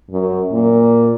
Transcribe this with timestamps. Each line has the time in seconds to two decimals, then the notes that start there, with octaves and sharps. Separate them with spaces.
0.11 F#2
0.52 A#2